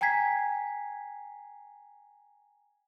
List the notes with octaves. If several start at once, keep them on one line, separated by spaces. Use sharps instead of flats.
G5 G#5 A#5 G#6 B6 C7